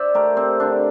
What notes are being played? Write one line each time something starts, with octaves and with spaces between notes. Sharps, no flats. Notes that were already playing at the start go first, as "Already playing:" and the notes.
Already playing: C5 D5 E5
A3 G4 A#4
C4
D3 D4